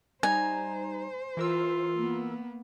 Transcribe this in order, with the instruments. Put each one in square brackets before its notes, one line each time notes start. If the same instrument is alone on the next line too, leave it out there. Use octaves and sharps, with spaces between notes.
[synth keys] G3 D#4 A#5 [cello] C5 [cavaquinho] G#5
[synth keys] E3 A#4 E6 [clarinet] F4
[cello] A#3 B3